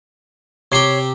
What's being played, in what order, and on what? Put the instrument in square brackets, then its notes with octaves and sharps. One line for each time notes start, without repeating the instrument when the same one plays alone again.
[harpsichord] C3 G4 [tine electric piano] C#5 C7